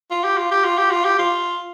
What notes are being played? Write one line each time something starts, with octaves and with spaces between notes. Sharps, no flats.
F4
G4
F4
G4
F4
G4
F4
G4
F4